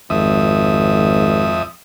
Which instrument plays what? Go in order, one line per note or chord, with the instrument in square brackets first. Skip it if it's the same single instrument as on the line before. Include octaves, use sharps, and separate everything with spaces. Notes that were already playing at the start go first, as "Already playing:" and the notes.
[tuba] G#1 [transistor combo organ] F2 E5 D#6